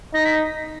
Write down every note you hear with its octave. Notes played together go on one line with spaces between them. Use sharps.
D#4 A#6
B6